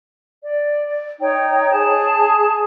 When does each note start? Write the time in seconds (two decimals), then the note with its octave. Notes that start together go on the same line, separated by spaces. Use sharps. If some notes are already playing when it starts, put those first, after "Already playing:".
0.42 D5
1.20 D#4 C#5 G5
1.70 G#4 A5